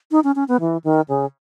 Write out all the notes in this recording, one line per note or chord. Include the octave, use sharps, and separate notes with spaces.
D#4
C#4
C#4
B3
E3
D#3
C#3